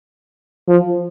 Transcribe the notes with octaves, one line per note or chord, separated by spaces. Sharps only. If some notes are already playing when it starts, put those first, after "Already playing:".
F3